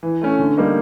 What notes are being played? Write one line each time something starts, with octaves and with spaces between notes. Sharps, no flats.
E3
A3 C#4
D3
G3 A#3 D#4